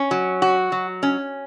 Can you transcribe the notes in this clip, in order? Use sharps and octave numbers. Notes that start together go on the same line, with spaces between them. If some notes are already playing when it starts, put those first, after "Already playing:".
Already playing: C#4
F#3
F#4
F#3
C#4